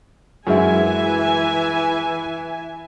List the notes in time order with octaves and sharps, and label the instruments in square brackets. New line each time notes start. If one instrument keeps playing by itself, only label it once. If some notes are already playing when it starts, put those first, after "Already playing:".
[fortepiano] F#2 G#3 E4 [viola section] E3 E5 G#5